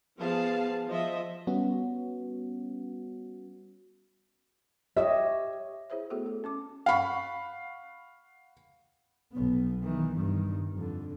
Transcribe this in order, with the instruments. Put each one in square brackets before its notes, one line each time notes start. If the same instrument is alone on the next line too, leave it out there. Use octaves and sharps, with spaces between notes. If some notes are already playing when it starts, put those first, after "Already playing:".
[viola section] F3 B3 G#4 F5 A5
F3 D#5 E5
[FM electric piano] G3 B3 C#4 F#4
[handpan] G4 C#5 D#5 [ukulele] E5
[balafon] E4 G#4 C5 C#5 E5
A3 B3 F#4 G#4 A4
A4
C#4 A5 D6
[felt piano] F5 F#5 B5 C#6
[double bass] B1 B3
D#3 E3
G2 D#3
F2 D3